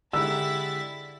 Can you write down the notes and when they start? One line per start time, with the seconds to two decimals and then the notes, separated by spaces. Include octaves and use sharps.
0.13 D3 G#3 E4 G4 E6 A6 B6